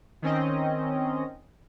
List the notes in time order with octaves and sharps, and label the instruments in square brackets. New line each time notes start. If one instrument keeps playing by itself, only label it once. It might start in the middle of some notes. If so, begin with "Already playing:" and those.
[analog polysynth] D#3 C4 C#4 D#5